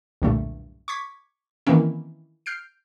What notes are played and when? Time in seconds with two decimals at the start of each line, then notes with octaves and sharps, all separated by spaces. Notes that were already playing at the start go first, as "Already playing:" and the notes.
0.22 B1 E2 G2 A#2 D3 A3
0.88 C#6 D6 G#6 B6
1.67 D#3 E3 A#3 C4 C#4 E4
2.46 F6 G6 C7 D7